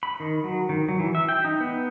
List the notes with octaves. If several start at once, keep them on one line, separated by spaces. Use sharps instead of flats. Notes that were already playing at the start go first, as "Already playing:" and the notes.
B5
D#3
F#3
D#3
F#3
E3
E5
G5
D#4
B3